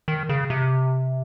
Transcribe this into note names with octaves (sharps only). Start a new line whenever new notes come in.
D#3
C#3
C3